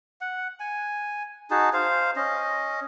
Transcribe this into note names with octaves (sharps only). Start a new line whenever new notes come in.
F#5
G#5
D#4 F#4 G#4 A5
C5 F5
C#4 D#5